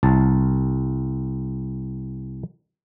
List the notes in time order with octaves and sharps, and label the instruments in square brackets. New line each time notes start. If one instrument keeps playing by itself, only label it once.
[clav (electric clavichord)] C2 A5